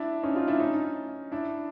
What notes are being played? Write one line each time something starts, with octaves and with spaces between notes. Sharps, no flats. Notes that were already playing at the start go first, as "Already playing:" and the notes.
Already playing: D4 E4
C#4 D#4
D#4 F4
D4 E4
C#4 D#4
D4 E4